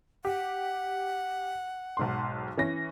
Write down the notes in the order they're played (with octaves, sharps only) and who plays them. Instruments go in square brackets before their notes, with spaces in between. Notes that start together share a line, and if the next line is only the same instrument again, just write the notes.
[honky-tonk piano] G4 [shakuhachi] F#5
[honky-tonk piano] B1 G#2 C6
E3 C#4 A#6